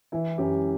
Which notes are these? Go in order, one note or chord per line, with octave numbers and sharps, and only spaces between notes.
E3 E4
F#2 G4